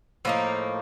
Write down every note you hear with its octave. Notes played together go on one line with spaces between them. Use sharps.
A2 F3 A#3 D#4